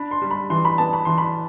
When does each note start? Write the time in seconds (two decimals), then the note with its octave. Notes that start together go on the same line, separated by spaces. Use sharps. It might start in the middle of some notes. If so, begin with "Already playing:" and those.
Already playing: D4 B5
0.11 C6
0.22 G3
0.31 B5
0.50 E3 C6
0.65 B5
0.78 B3 A5
0.93 B5
1.05 E3 C6
1.18 B5